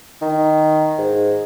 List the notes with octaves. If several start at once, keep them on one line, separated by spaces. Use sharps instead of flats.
D#3
G#2